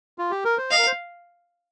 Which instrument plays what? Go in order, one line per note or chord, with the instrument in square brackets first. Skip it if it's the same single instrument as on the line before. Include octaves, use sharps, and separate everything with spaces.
[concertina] F4
G4
A#4
C5
[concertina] D#5 [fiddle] F5
[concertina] A#4
C5